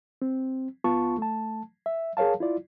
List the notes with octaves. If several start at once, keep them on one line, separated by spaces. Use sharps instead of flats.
C4
C#2 B3 F4 A5 C#6
A3 A5
E5
G#4 A#4 C#5 F5 A5
E4 F4 D5